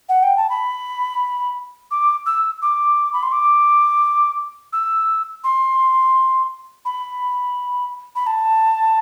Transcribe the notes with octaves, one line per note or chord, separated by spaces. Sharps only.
F#5
G5
A5
B5
D6
E6
D6
B5
C6
D6
E6
C6
B5
B5
A5